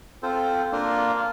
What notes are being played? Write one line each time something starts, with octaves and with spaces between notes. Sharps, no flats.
C4 F4 A4 C5
A#3 D4 F4 A#4